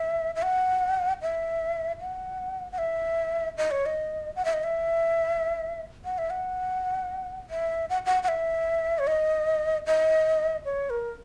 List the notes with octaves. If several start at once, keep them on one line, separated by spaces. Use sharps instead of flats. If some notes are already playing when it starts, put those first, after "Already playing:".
Already playing: E5
E5
F#5
E5
F#5
F#5
E5
D#5
C#5
D#5
F#5
E5
D#5
E5
F#5
E5
F#5
E5
F#5
F#5
F#5
E5
C#5
D#5
D#5
C#5
A#4